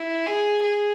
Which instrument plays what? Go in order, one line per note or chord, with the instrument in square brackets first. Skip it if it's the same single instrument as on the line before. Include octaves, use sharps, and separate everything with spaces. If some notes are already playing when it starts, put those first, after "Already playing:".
Already playing: [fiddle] E4
G#4
G#4